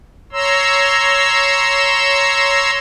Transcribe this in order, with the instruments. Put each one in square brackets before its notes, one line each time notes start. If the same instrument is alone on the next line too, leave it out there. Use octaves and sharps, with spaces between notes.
[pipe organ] C#5 A#5 C6 E6